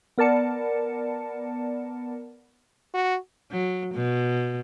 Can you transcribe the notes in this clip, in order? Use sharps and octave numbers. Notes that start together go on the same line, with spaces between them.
B3 A#4 D5 A5 C#7
F#4
F#3
B2